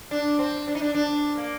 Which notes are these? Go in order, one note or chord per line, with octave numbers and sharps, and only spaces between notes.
D4
C4
D4
D#4
D4
D4
A#3